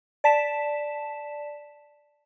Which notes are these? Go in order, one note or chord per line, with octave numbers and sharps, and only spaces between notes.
D5 A5 B6 E7